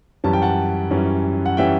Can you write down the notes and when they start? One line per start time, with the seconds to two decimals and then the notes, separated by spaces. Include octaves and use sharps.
0.24 F#2 E3 G3 C#4 A5
0.33 G5
0.42 F#5 A5
0.90 F#2 E3 G3 C#4
1.46 F#5
1.57 E3 G3 C#4 E5 G5